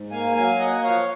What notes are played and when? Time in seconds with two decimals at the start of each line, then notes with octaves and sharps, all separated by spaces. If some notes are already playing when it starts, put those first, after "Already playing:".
Already playing: G#2
0.11 A#3 F5 G#5
0.36 F#3 F5 G#5
0.59 A#3 D#5 F#5
0.83 F3 C#5 F5